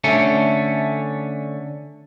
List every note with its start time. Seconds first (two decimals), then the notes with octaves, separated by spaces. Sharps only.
0.04 D3 A3 C#4